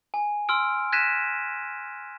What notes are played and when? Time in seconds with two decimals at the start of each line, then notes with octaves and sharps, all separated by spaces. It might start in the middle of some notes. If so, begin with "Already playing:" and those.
0.14 G#5
0.49 C6 E6 F6 D7
0.92 F#6 G#6 A#6 B6 D#7 E7